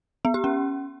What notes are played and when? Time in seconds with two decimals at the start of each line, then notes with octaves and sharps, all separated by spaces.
0.25 B3
0.34 G4
0.44 C#4